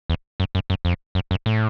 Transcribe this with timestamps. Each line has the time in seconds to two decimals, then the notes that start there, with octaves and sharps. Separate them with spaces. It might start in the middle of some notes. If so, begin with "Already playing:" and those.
0.10 E2
0.40 F#2
0.55 F#2
0.70 F#2
0.85 F2
1.15 F#2
1.31 F#2
1.46 A2